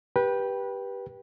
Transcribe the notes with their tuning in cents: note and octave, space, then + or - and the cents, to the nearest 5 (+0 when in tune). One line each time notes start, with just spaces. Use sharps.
G4 +0 B4 -20 G5 +0